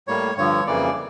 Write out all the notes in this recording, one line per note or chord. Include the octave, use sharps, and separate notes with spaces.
A2 G3 A#3 C#5
G2 D3 F3 C#5
F2 C#3 E3 G3 A#3 D5